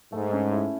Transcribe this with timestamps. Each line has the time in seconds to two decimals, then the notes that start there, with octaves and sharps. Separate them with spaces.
0.12 G#2 A3
0.33 C#4
0.52 E4